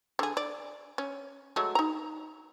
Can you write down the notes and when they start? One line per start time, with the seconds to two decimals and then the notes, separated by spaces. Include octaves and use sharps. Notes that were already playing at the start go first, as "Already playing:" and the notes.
0.19 D3 G#4
0.37 D5
0.98 C#4
1.56 F#3 G#3 A3
1.75 D#4 A#5